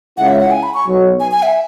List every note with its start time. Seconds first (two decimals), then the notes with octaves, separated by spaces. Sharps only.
0.17 C#2 C#3 G#3 C#4 E4 F#5
0.28 E5
0.41 F#5
0.51 G#5
0.63 B5
0.74 C#6
0.86 B1 B2 F#3
1.20 G#5
1.31 G#5
1.43 E5